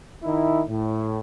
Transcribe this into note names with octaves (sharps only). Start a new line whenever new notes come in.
D#3 D#4 E4
A2